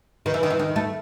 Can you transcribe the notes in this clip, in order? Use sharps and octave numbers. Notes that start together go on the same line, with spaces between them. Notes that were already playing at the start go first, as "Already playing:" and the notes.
D#3
E3
D#3
E3
D#3
A3